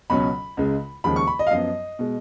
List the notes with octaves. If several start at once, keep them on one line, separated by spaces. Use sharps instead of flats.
C#2 B2 F#3 C#4 B5
C#2 C#3 G#3
D#2 C#3 F3 G#3 B5
C#6
B5
D#5
F5
F#2 F3 B3 D#5
B2 G#3